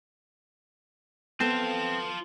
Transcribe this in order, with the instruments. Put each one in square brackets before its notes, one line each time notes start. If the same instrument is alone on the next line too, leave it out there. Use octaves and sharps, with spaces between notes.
[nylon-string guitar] B3 A4 [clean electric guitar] C4 [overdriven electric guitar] F4 A5